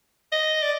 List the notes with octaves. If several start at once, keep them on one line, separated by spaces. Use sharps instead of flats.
D#5
D5